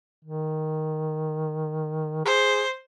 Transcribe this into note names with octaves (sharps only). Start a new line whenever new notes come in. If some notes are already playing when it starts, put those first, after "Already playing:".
D#3
G#4 C5